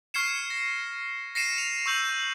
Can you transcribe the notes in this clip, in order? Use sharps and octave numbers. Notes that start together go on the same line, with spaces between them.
C#6 F6 G#6 C7 C#7 E7
A#6
A#6 C7 C#7 D#7 E7
F7
C#6 E6 G6 F#7